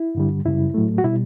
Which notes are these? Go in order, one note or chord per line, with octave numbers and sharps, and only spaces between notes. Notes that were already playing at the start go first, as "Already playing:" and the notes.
Already playing: E4
G2 D3 G3
F#2 C#3 G3 E4
A2 F#3 A3
F#4
B2 G3 E4